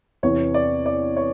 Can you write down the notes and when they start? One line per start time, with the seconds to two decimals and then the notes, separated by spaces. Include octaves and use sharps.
0.23 E2 C3 E3 C#5
0.54 D5
0.86 D5
1.17 C#5